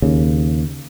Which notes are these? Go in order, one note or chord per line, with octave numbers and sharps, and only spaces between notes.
D#2 C#3